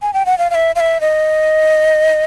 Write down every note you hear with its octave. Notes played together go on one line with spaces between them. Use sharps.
G#5
G5
F#5
F5
F5
E5
F5
E5
D#5